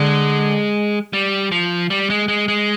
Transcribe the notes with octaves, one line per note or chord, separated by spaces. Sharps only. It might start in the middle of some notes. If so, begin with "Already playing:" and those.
Already playing: D3 G#3
G3
F3
G3
G#3
G#3
G#3